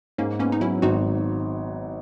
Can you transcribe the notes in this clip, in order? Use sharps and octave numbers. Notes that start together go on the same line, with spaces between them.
G#2 A#3 C#4
A#3 B3 C#4
D#4
F#3 C#4 E4
G#1 D#4 F#4